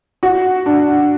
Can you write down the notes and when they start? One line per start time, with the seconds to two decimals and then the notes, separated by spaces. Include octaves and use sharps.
0.23 F#4
0.66 D4